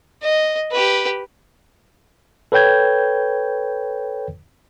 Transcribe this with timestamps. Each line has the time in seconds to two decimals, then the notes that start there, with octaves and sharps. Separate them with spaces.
0.23 D#5
0.72 G4 B4
2.52 A4 B4 C#5 G5 G6 G#6